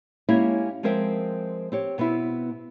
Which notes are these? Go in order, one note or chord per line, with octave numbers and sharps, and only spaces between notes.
G#3 A#3 C#4 E4 G4 C#5
F3 G#3 C4 A#4 C5 E5
C4 G4 C#5
B2 B3 C4 E4